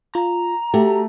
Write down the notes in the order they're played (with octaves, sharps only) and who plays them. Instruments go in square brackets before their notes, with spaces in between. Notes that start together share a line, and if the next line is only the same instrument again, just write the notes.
[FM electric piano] F4 [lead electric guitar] A#5
[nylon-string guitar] A3 F#4 [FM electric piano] G4